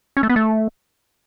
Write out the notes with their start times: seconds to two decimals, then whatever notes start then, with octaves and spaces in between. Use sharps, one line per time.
0.17 C#4
0.23 A3
0.29 B3
0.36 A3